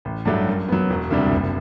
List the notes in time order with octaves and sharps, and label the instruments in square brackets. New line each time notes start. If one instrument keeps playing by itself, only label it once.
[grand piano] A1
G2 F#3 A3 D4
F#2
F#3 B3
E1
D2 C3 G3 D4
F#1